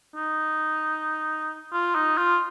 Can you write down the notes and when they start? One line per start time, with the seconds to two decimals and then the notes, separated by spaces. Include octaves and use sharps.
0.15 D#4
1.73 F4
1.95 D#4
2.18 F4